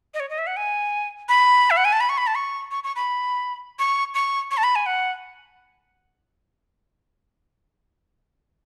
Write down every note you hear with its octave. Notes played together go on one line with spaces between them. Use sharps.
D#5
C#5
D#5
E5
F#5
G#5
B5
E5
F#5
G#5
A5
B5
C#6
B5
A5
C#6
C#6
C#6
B5
C#6
C#6
C#6
A5
B5
G#5
F#5